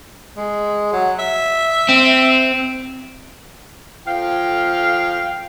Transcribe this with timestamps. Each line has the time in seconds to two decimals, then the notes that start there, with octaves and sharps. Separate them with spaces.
0.37 G#3
0.92 F#3
1.19 E5
1.89 C4
4.07 F3 F5 G5